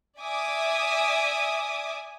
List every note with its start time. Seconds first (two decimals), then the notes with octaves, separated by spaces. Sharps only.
0.19 D5 E5 G#5 D6 D#6